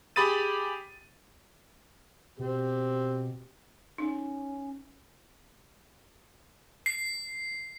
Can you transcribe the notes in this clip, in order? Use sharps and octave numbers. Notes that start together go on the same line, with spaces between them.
G4 G#4 B5 D#6 A6 D#7
B2 C4 G4
C#4 D#4
C7